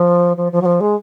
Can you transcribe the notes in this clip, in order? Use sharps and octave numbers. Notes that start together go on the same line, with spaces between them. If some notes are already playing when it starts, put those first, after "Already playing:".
Already playing: F3
F3
F3
F#3
F3
G#3